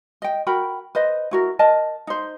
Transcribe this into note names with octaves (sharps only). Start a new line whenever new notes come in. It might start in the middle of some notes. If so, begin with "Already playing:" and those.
D#5 G5
F#4 A#4 G5 B5
B4 C5 D#5
E4 F#4 A#4
A#4 D#5 A5
D#4 C5